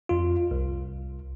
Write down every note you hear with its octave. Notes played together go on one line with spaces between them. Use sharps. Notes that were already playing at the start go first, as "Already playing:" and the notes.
F2 F4
C2